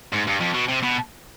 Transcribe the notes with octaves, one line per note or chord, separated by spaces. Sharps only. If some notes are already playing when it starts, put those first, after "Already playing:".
G#2
G2
F2
B2
C3
B2